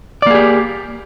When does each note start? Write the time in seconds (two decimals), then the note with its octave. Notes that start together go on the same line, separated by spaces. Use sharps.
0.22 D5
0.26 A#3
0.31 G#4
0.35 G4